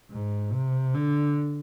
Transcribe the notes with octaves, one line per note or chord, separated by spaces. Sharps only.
G#2
C3
D3